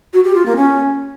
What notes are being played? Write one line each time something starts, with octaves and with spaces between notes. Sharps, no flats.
F#4
G4
F4
A#3
C#4